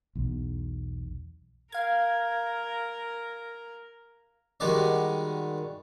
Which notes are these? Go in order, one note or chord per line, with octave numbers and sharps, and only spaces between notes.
B1 E2
A#4 F5 G#6
D#3 G3 G#3 F#4 D5 D#5